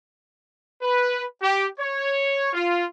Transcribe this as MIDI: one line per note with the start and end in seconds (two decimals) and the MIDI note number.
0.82 1.23 71
1.42 1.66 67
1.78 2.53 73
2.53 2.84 65